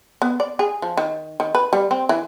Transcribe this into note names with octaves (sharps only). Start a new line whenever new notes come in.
B3
D5
G#4
F3
D#3
D#3
B4
G3
C4
E3